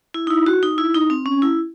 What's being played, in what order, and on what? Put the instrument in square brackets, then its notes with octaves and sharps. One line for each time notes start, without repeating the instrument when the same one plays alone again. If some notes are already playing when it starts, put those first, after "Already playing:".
[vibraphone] E4
D#4
E4
F#4
D#4
E4
D#4
C4
C#4
E4